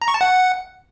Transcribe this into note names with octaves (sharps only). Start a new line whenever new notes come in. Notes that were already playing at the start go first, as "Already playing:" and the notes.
A#5
C#6
A5
F#5